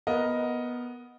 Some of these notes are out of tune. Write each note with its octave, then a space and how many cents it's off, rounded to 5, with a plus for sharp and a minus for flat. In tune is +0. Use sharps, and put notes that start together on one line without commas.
B3 -10 A#4 +0 D#5 +5